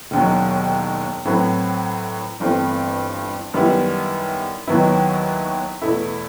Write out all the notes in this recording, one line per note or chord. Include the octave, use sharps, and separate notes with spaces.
E1 D#2 D#3 F#3
A2 F#3 C4 E4 B4
G1 G2 E3 A3 C4
F#2 D#3 G3 B3 E4
D#2 D#3 F#3 B3 E4
E2 B2 A3 E4